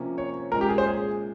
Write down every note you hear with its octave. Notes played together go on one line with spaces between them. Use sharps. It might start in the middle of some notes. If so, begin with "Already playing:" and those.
Already playing: C3 F3 A#3 C#4
C#5
A#2 G#3 C#4 A#4
G4
G#4
C5
G#4